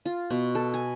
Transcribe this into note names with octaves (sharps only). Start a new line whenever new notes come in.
F4
B2
A4
G#5